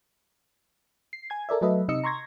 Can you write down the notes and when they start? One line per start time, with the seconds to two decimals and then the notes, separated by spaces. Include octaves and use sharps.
1.13 C7
1.30 G#5 G#6
1.49 A4 A#4 D5 E5
1.61 F#3 A3 A4 B4 D#5 E5
1.88 C3 D#4 D#5 E6 C#7
2.04 A#5 C6 C#6 G#6 A#6